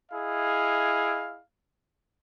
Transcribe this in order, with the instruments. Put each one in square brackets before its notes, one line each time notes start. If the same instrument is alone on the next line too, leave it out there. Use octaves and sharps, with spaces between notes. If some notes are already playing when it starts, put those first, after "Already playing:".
[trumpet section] E4 G#4 D#5 F5